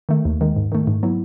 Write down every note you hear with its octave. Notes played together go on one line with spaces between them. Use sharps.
D#3 A3
D#2
D#3 G#3
G#2
D#3 A3
G#2
F#3 B3 E4